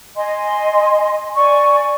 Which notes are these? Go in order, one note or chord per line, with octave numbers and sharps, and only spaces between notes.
D#5 G#5 C6
D5 G#5 C#6